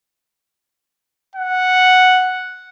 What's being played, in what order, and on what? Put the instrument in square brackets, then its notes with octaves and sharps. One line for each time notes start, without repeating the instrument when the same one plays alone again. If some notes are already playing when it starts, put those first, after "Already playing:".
[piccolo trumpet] F#5